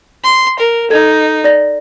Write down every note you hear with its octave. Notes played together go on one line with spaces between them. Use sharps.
C6
A#4
D#4 A4 G#6
D5 A#6